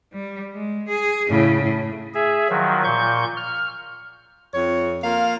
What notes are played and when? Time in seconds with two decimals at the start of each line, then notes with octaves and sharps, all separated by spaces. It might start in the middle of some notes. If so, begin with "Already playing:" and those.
0.13 G3
0.54 G#3
0.88 G#4
1.30 A2 C#3
1.62 A2
2.15 G#4 E5
2.50 D#3 F3 F#3
2.84 A#2 C#6 G6
3.37 F6
4.53 F2 C#5
5.03 A#3 F4 F5